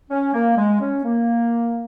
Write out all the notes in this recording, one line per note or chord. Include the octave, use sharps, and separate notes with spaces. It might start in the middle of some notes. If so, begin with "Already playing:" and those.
C#4
A#3
G#3
C#4
A#3